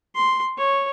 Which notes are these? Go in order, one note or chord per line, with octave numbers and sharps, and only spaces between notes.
C6
C#5